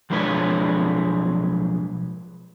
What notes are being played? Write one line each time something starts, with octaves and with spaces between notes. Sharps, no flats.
B1 F3 G#3 D4 B4 C#5